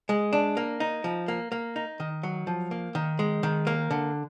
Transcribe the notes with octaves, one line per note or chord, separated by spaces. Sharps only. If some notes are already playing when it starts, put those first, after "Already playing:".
G#3
D4
A#3
D#4
F3
A#3
A#3
D#4
D#3
F#3
F3
A#3
D#3
G#3
D#3
A#3
D3